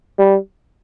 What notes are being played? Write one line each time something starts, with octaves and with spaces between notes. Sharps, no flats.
G3